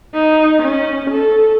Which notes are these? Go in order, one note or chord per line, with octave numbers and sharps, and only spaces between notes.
D#4
C#4
A4